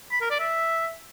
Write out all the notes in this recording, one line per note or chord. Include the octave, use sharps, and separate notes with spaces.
B5
A#4
D5
E5